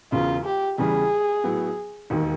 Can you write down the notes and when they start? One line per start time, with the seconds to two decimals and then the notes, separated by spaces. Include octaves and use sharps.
0.12 E1 E2 C#3 F4
0.45 G4
0.78 E2 C#3 E3 G3 G#4
1.44 A2 F#3 B3
2.10 E1 D#2 D#3